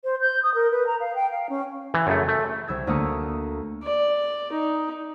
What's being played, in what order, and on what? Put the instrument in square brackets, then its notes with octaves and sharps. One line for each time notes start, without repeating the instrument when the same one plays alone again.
[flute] C5
G6
D#6
A#4
B4
A#5
F5
G5
F5
C#4
[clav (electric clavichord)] E3
F#2 C#3 A3
A3
[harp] C2 E6 G#6
D2 A3 A#3 D#6 E6 C#7
[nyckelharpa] D5
D#4